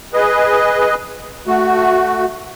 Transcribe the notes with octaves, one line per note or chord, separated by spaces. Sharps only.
G#4 B4 D#5
A3 F#4